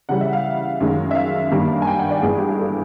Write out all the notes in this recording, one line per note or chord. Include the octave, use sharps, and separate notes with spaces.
C#3 E3 G3 F#5
E5
F5
F#2 D#3 G#3
E5
F5
G2 D#3 G3 A#3
G#5
G5
F#5
D5
G2 E3 G#3 B3 G#4
G4
G#4
A4